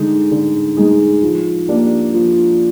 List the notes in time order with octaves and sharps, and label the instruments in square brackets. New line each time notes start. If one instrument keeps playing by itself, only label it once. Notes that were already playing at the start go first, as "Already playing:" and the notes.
Already playing: [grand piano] D3 G#3 D#4 G#4
D3
G#3 D#4 G#4
F3
A#3 D4 G4
F3